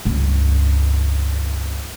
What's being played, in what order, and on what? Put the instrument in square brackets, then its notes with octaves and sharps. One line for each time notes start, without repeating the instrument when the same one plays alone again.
[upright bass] C#2 G2